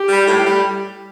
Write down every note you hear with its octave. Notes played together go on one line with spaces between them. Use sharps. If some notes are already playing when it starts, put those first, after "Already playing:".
Already playing: G4
G3
A2
G3